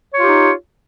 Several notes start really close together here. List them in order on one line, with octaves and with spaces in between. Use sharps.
C#5 F4 G4 D#4